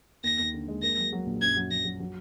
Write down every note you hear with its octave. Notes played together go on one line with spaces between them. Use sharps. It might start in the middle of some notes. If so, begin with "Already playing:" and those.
D#2 A#6
D#2
D3
G#3
A#3 A#6
F#3
F#3
A#1
F#2 G#6
F#3
F#3 A#6
F#3
F#3